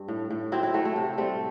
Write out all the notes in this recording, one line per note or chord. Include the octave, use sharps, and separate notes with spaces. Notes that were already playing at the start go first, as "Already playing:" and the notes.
Already playing: G2 G4
A2
A2
F#3 C4 E4
C4 E4
F#3 A3
A3
C3 A3
G3 A3 C4